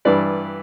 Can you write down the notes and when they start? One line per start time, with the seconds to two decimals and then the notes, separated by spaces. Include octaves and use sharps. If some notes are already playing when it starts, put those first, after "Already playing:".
0.05 G2 E3 B4 D5